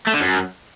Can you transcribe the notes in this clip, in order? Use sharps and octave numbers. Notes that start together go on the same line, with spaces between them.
A3
D3
F#2